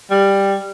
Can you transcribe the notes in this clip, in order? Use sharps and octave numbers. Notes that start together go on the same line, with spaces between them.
G3